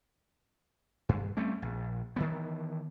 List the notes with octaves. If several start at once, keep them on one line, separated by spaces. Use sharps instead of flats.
G2
G3 A3 C4 C#4
A#1
D#3 E3 B3